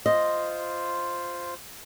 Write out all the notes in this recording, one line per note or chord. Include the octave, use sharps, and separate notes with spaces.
F4 C5 D#5